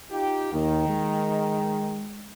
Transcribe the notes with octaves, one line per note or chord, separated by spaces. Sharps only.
D#4 F4 G4
D#2 D#3
G#3